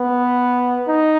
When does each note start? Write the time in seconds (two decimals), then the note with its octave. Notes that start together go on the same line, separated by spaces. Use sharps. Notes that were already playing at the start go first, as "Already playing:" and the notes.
Already playing: B3
0.88 D#4